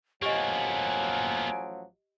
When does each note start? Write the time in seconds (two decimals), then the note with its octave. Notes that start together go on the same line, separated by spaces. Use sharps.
0.22 A1 F3 F#3 A#3 B3 G4 D#5 G#5